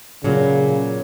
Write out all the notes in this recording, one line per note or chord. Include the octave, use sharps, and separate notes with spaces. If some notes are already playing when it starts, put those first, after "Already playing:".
A#2 C#3 F#3